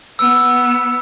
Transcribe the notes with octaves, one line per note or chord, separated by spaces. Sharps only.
B3 E6